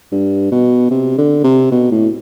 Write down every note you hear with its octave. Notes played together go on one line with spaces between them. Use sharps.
G2
B2
C3
D3
C3
B2
A2